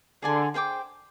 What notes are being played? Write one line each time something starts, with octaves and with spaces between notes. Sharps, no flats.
D3 G#4 D5 G#5 C6
G#4 C5 G5 D6